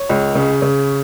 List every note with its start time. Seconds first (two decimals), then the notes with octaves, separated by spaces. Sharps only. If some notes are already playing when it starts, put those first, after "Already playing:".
Already playing: C#5
0.09 C#2
0.35 C#3
0.62 C#3